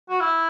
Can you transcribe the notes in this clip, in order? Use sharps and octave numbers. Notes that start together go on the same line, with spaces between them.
F#4
E4